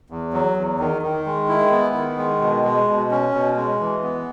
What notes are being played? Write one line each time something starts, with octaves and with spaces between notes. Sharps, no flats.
E2
F#3
E2
D#3
D#3
G#3
E4
B3
D#3
G#3
B2
G#3
B2
C#4
B2
G#3
E3
B3